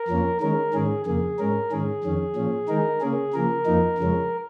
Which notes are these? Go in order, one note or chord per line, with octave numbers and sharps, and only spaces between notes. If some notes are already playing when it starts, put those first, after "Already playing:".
Already playing: A#4
F2 F3 A#3 C#4
D#3 G#3 C#4 A#4
G#2 D#3 C#4 G#4
F2 C#3 A#3 G#4
G#2 G#3 C#4 A#4
G#2 D#3 C#4 G#4
F2 D#3 C#4
A#2 F3 C#4
D#3 G#3 D#4 A#4
C#3 A#3 C#4 G#4
C#3 F3 A#3 A#4
F2 F3 A#3 D#4
F2 C#3 F3 G#3 C#4